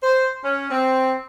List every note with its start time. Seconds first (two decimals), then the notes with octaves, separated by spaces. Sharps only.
0.03 C5
0.43 C#4
0.70 C4